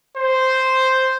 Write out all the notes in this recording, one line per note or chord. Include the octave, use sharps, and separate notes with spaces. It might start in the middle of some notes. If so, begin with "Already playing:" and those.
C5